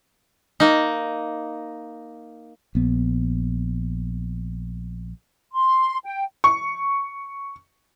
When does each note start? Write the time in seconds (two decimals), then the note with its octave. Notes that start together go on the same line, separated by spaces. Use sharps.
0.60 A#3 D#4
2.75 A#1 B3
5.52 C6
6.04 G5
6.44 C#6